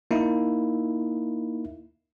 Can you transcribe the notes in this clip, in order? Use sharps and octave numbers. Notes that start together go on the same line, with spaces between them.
A#3 D#4 E4